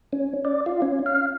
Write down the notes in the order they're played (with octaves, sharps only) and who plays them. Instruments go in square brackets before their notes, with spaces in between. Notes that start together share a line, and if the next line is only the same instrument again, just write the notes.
[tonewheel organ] C#4
D5
F4
C#4
F5